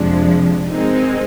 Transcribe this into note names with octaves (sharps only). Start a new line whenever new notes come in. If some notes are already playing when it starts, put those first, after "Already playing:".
Already playing: F2 C3 F3 G#3 D4
D#3 G#3 C4 D#4